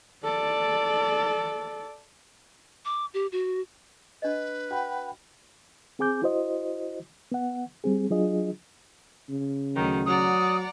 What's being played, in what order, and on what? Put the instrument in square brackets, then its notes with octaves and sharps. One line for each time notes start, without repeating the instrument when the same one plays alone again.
[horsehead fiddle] A4 D5
[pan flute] D6
G4
F#4
[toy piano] D4 D#5 [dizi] B4
[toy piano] F#4 [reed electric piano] F#5 G5 B5
[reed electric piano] C4 G#4 G#5 D6 G6
E4 F#4 C5 D#5
B3 F#5
G3 C4 G#4
F#3 D4 F4 G#4 D#5
[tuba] C#3
[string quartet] D2 D#3 [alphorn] F#3
[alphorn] F#3 [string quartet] D5 F#5 A#5 [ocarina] D#6